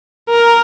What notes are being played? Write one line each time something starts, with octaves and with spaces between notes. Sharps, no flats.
A#4